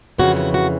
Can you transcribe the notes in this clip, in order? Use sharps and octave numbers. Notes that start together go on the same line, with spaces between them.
F2 C#3 E3 F#4
F#4
F#4